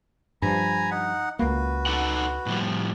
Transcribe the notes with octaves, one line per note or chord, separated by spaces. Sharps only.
G2 F3 G#5 A#5 B5
D#4 F#5
C#2 A#3 F#4 B4
D#4 A4 F#5
A2 F3 G3